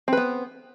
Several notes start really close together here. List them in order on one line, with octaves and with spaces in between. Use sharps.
C4 B4 B3